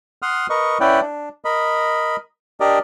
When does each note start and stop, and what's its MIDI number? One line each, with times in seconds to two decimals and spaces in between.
0.22 0.47 78
0.22 0.47 84
0.22 0.47 87
0.22 0.47 89
0.50 0.78 70
0.50 0.78 71
0.50 0.78 75
0.50 0.78 85
0.80 1.01 61
0.80 1.01 64
0.80 1.01 71
0.80 1.01 74
0.80 1.01 78
0.80 1.01 79
1.02 1.29 62
1.45 2.16 70
1.45 2.16 75
1.45 2.16 83
2.60 2.79 62
2.60 2.79 67
2.60 2.79 70
2.60 2.79 74
2.60 2.79 75